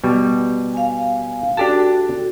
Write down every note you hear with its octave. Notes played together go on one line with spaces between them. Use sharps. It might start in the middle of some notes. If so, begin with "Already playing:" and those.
B2 G3
F5 G#5
D4 F#4 G4 A4 A5